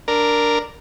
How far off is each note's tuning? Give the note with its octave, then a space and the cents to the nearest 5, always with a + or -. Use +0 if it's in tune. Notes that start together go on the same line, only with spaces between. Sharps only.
D4 +0 A#4 +0